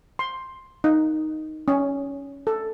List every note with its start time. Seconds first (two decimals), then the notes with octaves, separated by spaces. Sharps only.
0.19 C6
0.84 D#4
1.68 C#4
2.47 A4